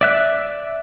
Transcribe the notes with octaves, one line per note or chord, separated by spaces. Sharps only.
D5 E5 F#6